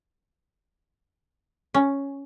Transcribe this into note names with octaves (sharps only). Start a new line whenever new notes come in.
C#4